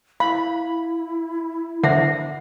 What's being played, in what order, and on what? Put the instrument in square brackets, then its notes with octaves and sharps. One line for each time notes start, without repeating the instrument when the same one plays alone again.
[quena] E4 [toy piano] F5 [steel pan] B5
[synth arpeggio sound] D3 [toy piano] C5 E5 F#5